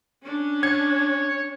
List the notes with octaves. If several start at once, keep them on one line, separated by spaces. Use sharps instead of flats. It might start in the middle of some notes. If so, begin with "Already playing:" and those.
C#4 D4
C#5 G#6